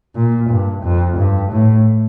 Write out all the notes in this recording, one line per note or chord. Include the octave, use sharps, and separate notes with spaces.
A#2
G2
F2
G2
A2